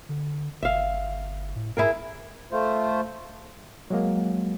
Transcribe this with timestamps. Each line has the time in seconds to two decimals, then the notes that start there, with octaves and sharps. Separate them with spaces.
0.09 D3
0.63 G1 E5 F5
1.56 A2
1.77 G#2 E4 G#4 A#4
2.52 A3 F4 C5
3.90 F#3 G#3 A#3